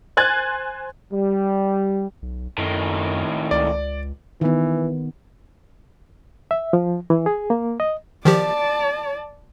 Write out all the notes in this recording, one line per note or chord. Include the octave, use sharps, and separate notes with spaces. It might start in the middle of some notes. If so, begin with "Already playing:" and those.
C5 G#5 F#6 G#6 A6
G3
B1
F#2 A2 D#3
C#2 D5
D#3 E3 B3
E5
F3
E3
G#4
A#3
D#5
D#3 F3 G4 D5 A5